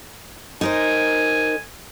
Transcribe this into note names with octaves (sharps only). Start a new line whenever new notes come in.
D#4 A#4 C5 G#5